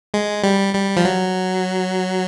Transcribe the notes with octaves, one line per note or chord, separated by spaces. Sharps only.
G#3
G3
G3
F3
F#3